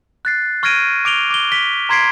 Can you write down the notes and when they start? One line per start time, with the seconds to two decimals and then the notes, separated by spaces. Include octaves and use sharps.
0.25 F#6 A6 C7
0.63 C#6 F6 G#6 A#6 D7 D#7
1.05 D6 D7 F7 G7
1.30 D6 G7
1.52 B6 G7
1.89 A#5 C6 G#6 B6 C7 D7